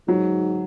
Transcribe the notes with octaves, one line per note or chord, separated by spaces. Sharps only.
G#2 F#3